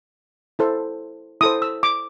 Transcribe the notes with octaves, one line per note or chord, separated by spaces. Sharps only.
E4 A4 C5
E4 A4 C5 D#6
E6
D6